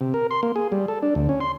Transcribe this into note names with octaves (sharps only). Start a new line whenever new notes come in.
C3
A#4
C6
A#3
G#4
G3
A4
D4
D2
C#4
C6